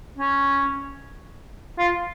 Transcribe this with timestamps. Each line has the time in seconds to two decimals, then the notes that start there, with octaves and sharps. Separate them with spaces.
0.18 C#4
1.78 F4